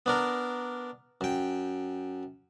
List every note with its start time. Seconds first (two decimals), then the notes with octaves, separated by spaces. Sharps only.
0.06 B3 D4 A#4
1.21 F#2 G5